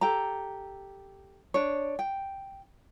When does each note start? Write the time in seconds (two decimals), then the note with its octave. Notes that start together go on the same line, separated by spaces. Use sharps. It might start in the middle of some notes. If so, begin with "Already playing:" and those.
0.01 G4 A4 A#5
1.54 D4 C#5
1.99 G5